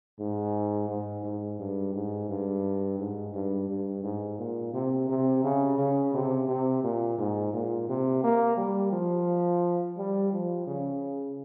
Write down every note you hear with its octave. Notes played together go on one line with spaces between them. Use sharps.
G#2
G#2
G#2
G2
G#2
G2
G#2
G2
G2
G#2
A#2
C3
C3
C#3
C#3
C3
C3
A#2
G#2
A#2
C3
A#3
G3
F3
G3
F3
C#3